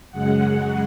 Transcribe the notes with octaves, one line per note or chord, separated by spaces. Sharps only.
F#2 C#3 G#3 F#5